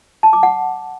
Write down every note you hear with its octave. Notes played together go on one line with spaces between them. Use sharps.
A5
D6
F#5